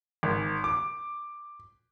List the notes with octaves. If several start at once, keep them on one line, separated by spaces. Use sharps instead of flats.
G#1
D6